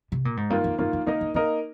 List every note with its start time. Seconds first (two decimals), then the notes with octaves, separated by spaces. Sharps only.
0.12 C3
0.25 A#2
0.37 G#2
0.50 G2 D#3 A#3 F4
0.64 F2
0.78 G2 D#3 A#3 F4
0.93 F2
1.06 D3 A#3 D#4 A#4 D#5
1.21 D3
1.34 D3 A#3 D#4 A#4 D#5